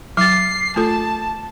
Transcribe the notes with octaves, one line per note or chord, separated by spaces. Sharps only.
F#3 D6 A6 C7
A3 F4 A4 A5